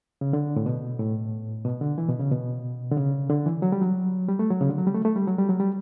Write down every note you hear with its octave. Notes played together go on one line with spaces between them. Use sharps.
C#3
D3
A2
B2
A2
B2
D3
E3
B2
C#3
B2
D3
C#3
D3
E3
F#3
G3
F#3
G3
A3
F#3
C#3
D3
F#3
G3
A3
A3
G3
F#3
G3
F#3
G3